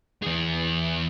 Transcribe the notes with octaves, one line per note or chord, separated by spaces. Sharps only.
E2 G#4